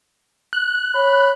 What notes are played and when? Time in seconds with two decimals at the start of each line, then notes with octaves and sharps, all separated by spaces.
0.53 F#6
0.95 C#5 B5